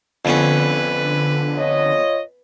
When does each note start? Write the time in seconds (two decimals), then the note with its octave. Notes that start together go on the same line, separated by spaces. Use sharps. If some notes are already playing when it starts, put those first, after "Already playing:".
0.25 F2 D3 B3 C#4 B4
1.56 F4 C#5 D#5